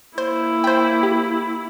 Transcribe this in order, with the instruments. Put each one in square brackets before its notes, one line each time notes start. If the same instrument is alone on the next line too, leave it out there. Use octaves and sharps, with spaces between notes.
[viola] A#3 E4 [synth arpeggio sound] C5
[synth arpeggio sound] C5 G5
G4